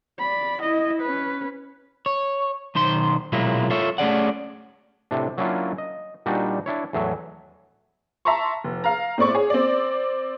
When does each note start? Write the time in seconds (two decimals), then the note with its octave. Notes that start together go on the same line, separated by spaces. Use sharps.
0.19 D5 B5
0.62 E4 D#5
1.01 C#4 B4
2.06 C#5
2.75 B1 D#3 C5 C6
3.32 B1 A#2 F#3 G#3 A#3 E4
3.70 F4 A4 C#5 E5
3.98 A3 C#4 G#4 D5 F#5
5.11 A2 C3 D4
5.38 F#3 A#3 C#4 D4 E4 F4
5.78 D#5
6.26 A#2 G3 D4 D#4 F#4
6.66 D4 E4 C#5
6.93 E2 A2 F#3 E5
8.25 E5 A5 A#5 C6 C#6
8.64 F1
8.84 F5 A#5
9.18 A2 C4 D5 C#6
9.35 G#4 C#5
9.50 C4 D5